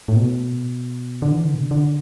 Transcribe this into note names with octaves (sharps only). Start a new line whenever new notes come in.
A2
B2
D3
E3
D3
B2
D3
D3